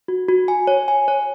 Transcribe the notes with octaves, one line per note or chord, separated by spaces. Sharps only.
F#4
F#4
G#5
C#5
G#5
C#5